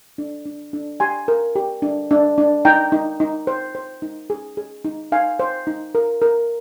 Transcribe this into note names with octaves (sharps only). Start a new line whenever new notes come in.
D4
D4
D4
G4 G#5 C6
A#4
G4
D4
D4
D4
D#4 G5 A#5
D#4
D#4
C5
C5
D#4
G#4
G#4
D#4
D#4 F5 G#5
C5
D#4
A#4
A#4